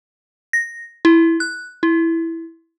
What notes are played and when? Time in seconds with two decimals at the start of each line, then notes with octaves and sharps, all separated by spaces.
0.53 A#6
1.05 E4
1.40 F#6
1.83 E4